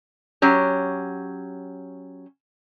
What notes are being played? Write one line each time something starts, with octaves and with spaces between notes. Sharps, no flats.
F#3 C#4 G4